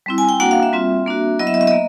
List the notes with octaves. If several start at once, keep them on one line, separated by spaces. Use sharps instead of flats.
G3 C4 E4
G#5
G5
A#3 D4 F#4 F#5
F5
E5
G3 C4 F4
A#3 D4 F#4
F#3 B3 E4 D#5
E5
D#5
E5
A#3 D#5